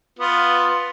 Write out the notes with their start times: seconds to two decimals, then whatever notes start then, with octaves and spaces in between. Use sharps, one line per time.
0.19 B3 F4